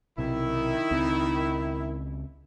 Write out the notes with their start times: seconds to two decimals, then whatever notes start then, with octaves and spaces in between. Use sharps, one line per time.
0.18 B1 C3 D#3 E4
0.91 C#2 C4